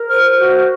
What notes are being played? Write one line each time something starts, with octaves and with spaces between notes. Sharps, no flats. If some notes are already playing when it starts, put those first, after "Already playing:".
Already playing: A#4
C5 F6
F#4